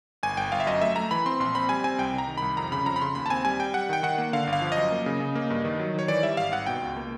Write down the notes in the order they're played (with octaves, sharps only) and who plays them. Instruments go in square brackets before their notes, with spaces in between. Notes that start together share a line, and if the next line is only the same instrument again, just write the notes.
[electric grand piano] G1 G#5
G1 G5
G1 F5
E5
F#2 D#5
A3 E5
A3 A#5
E3 B5
C4 C6
A#1 C6
C4 B5
G3 G#5
C4 G#5
C2 G5
C2 A#5
D#3
C2 B5
F2 A#5
C#3 B5
F2 A#5
B5
C#3 C6
D#2 B5
A5
C4 G#5
G3 G#5
G3 G5
G3 F#5
D#3 G5
D#3 F#5
A#3
D3 F5
G1
F5
F3
D#5
F#2
A#3
C#3
C#3
A#3
G2
D#3
F#3
D#3 C#5
E3 D5
G3 E5
G#1 F5
G#1 F#5
B2 G5
C#2
A#3